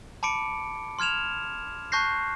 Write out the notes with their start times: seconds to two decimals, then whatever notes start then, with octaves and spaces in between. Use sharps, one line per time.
0.23 A5 B5 D6 C#7 D7
0.99 C6 F6 G#6 E7 F7
1.92 A5 C#6 F#6 G6 A#6 C7